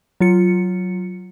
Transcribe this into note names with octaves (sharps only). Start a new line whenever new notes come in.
F#3 F4 C#7